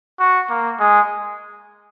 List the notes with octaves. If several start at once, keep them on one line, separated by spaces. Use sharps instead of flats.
F#4
A#3
G#3